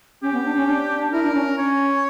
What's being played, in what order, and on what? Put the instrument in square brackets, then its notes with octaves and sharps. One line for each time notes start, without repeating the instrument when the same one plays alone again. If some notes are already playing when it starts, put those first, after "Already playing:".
[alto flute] C#4 [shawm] G4
[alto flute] B3
D4
C#4
D4
[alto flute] E4 [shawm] A#4
[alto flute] D4
C#4
C#4
[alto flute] C#4 [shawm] C#5